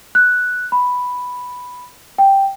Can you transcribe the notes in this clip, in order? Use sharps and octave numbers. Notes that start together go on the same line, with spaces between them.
F#6
B5
G5